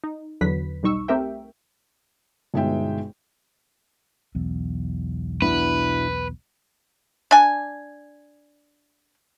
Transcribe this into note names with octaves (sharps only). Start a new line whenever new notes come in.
D#4
E2 D3 F#3 B4 B6
B1 G3 D#4 C#6 E6
A3 C4 G4 A#4 E5 G5
G1 B2 G#3 D#4 E5 G5
B1 E2
B2 D4 E4 B4
D4 G#5